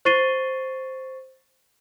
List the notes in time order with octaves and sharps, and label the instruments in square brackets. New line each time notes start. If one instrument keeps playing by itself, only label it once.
[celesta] C5 C#6 A6 C7 D#7 G7